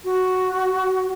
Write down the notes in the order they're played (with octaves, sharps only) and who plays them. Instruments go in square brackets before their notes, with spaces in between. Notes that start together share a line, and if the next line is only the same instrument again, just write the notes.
[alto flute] F#4